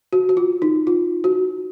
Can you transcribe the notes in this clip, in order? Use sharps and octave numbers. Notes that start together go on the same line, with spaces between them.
F#4
F#4
F4
D#4
F4
F#4